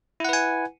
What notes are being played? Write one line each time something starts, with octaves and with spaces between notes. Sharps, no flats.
E4 B4 F#5 G#5